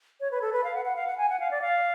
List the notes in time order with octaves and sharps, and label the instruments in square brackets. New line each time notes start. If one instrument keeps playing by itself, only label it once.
[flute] C#5
B4
A4
B4
F5
F#5
F#5
F5
F#5
G#5
F#5
F5
D5
F5